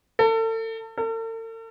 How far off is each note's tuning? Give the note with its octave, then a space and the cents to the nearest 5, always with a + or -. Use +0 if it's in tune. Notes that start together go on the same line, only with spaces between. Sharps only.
A4 +35
A4 +45